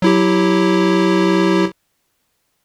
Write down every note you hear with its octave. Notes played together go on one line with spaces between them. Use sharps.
F#3 E4 G4